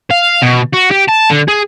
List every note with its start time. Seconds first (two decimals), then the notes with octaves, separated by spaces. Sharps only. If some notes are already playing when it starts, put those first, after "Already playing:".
0.10 F5
0.42 B2
0.73 F#4
0.91 G4
1.08 A5
1.30 D3
1.48 G#4